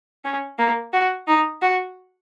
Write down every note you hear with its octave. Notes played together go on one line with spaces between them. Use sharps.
C#4
A#3
F#4
D#4
F#4